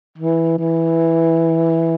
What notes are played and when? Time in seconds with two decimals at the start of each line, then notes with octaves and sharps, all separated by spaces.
0.18 E3
0.58 E3